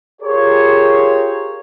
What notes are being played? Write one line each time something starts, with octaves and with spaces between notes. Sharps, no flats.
F4 G4 G#4 A#4 C5 C#5